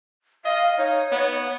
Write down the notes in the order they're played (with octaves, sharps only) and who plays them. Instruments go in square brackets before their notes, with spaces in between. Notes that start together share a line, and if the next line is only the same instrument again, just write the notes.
[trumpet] D#5 [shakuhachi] F5
[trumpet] D#4 [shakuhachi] C#5
[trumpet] B3 [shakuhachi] C#5